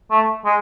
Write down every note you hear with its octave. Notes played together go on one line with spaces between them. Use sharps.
A3
G#3